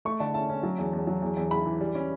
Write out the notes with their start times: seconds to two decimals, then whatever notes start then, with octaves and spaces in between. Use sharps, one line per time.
0.05 A3 C#6
0.20 D3 A5
0.34 C#4 A5
0.50 C#4
0.63 F#3
0.78 E2
0.93 E2
1.07 F#3
1.22 E2
1.36 E2
1.51 C#3 B5
1.66 E3
1.81 G3
1.95 C#4